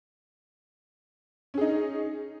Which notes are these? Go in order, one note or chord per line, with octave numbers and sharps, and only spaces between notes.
C#4 D#4 G#4